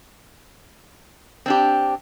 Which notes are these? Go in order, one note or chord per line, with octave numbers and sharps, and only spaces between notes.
C4 D4 G4